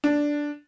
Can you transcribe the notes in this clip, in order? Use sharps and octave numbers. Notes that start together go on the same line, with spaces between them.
D4